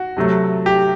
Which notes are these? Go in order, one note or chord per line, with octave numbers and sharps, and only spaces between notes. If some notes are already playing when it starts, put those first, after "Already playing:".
Already playing: F#4
C3 F#3 A3
G4